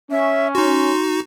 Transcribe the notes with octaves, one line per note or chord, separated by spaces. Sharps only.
C#4 E5
D#4 F#4 C6